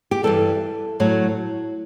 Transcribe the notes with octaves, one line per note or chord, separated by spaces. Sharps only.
G4
G2 E3 G3 A4
A2 F#3